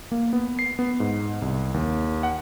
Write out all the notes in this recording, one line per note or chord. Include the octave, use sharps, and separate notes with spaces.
A#3
B3
C7
B3
G#2
C2
D#2
F#5